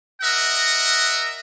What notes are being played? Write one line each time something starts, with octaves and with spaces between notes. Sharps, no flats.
A#4 D#5 E5 F#5